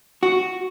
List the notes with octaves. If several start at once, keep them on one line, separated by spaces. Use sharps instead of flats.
F#4